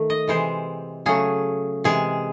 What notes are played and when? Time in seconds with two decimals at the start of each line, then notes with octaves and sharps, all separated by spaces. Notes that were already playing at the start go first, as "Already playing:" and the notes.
Already playing: D#3 A3
0.10 D#5
0.28 C3 E3 G#3 C5
1.06 C#3 F#3 A3 G#4
1.84 C3 E3 G#3 G#4